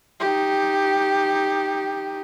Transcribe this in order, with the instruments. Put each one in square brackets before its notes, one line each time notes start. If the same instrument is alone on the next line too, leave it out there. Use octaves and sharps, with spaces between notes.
[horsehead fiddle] D#4 G4